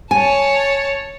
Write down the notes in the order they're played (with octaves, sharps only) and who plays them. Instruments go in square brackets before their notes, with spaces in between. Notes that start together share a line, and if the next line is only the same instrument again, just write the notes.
[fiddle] C#5 A5 [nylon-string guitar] G#5